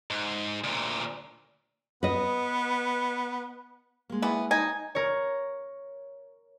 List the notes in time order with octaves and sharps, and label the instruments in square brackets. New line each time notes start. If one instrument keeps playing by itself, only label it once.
[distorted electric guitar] G#2
D2 A#2
[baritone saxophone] B3 [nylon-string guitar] B4 D#5
[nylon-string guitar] G#3 A#3
[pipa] E3 B3
[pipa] D#4 [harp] G#5
[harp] A#4 C#5